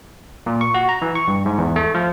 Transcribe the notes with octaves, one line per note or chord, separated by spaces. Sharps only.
A#2
C#6
F#4
A#5
E3
C#6
G2
G#2
E2
A3
F3